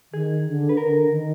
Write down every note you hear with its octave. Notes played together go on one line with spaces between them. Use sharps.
D#3 G#4
D3
B4
D3 A#4
D#3